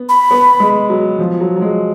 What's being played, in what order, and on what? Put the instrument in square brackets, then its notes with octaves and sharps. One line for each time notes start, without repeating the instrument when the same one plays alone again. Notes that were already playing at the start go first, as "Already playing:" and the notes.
Already playing: [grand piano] B3
[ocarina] B5
[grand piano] B3
G#3
F#3
F3
F#3
F#3
G#3